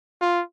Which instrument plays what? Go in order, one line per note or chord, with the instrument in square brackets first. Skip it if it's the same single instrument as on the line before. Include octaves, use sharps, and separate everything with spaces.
[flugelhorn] F4